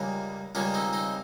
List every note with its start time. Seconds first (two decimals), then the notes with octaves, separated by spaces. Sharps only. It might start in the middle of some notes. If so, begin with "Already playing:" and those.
Already playing: C#2 C#3 G3 A#3
0.55 C#2 C#3 G3 A#3 C#4 F4
0.74 C4 D#4
0.93 C4 D#4